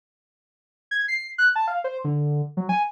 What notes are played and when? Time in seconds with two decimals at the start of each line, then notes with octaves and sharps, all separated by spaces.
0.91 G#6
1.08 C7
1.38 F#6
1.56 A5
1.68 F5
1.84 C5
2.04 D3
2.57 F#3
2.69 G#5